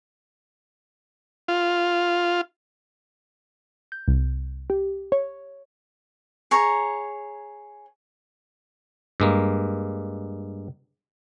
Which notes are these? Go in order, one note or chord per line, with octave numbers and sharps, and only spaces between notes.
F4
G6
C2
G4
C#5
G#4 C#5 A#5
G2 G#3 A#3